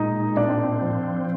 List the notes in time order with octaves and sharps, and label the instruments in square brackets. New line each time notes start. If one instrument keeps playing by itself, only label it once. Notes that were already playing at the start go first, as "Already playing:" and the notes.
Already playing: [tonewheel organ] A#2 G#3 [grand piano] D#4 D#5
[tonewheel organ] C4 [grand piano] D4 D5
[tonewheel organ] F3